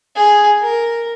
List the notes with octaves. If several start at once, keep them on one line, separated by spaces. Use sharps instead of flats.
G#4
A#4